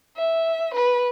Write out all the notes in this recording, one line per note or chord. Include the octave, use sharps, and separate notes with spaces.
E5
B4